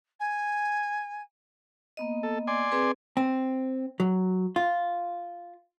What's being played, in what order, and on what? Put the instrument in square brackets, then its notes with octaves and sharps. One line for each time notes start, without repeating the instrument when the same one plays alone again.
[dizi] G#5
[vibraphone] A#3 B3 D#5
[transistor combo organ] A4
D5 G#5 C6
[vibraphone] C4 G#4 B4
[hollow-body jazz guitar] C4
F#3
F4